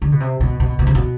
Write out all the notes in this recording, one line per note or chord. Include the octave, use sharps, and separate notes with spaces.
D3
B2
C3
B2
B2
B2
C3
B2